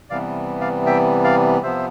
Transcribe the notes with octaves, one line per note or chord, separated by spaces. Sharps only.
C3 E3 G3 B3 D5 F5
D5 F5
E5 G5
D5 F5
C3 F3 B3 C5 E5